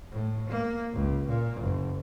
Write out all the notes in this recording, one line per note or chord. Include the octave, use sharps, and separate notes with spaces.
A2
A#3
C#2
A#2
F#1